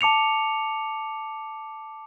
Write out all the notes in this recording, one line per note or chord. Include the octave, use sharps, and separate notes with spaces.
A5 D6 C#7 F7